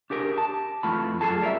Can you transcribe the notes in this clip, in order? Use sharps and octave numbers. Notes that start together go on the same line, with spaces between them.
D4 G4 G#4 A#4
A5
F2 E3 A3 F4 A5 B5
F#2 E3 F4 G#4 A4 A5
G3 A#4 B4 E5